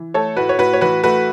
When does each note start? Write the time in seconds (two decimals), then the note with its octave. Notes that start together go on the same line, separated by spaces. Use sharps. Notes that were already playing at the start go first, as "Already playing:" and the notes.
Already playing: E3
0.14 A3 A4 C#5
0.37 A2 F#4 B4
0.49 C#5
0.59 A2 F#4 B4
0.73 C#5
0.81 E3 F#4 B4
1.03 A3 F#4 B4